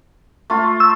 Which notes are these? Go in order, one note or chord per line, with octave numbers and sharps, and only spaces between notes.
A3 F4
E6